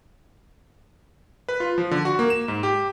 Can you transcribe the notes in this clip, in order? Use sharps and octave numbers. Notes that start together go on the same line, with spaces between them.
B4
F4
F3
D3
F#4
A#3
E7
G#2
G4